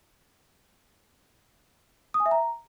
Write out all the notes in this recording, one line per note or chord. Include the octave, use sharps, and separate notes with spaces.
D#6
G#5
E5
A#5